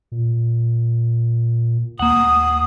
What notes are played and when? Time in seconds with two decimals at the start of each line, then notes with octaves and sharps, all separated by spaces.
0.12 A#2
1.99 D#2 A#3 F#5 D#6